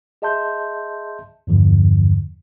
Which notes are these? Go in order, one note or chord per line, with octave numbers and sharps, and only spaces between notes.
G#4 D#5 E5 A5 C6 G6
E2 G2 D3 F3